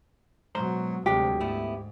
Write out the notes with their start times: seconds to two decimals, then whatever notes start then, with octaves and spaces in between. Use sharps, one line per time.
0.55 G#2 B2 F#3 C5 A#5
1.06 D2 G2 C3 F#3 G#3 G4
1.40 G#2 A3 B3 E4